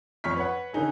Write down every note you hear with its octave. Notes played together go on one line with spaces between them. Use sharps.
F2 C#5 C#6 F6 B6
B4 C#5 F#5
D3 D#3 C#4 D#4 G#4